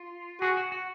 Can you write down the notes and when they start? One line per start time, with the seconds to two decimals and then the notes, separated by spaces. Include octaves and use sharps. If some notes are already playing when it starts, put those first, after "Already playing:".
Already playing: F4
0.41 F#4 G#4
0.57 F#4
0.72 F#4